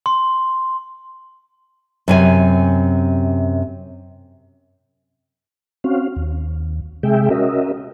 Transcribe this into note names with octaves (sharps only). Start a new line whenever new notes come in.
C6
F#2 C3 G#5
C4 C#4 F#4 F5
D#2
C3 G#3 G#4 E5 G5
C#4 F#4 A#4 D#5 E5